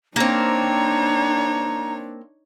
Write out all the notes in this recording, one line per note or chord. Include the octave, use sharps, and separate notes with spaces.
A#3 C4 D4 D#4 C#5 A#5